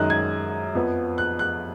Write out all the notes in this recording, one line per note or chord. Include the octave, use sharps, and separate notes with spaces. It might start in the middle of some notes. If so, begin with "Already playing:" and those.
Already playing: F#2 D#3 G#3 D#4 F#6
G#6
F2 F3 B3
F#6
F#6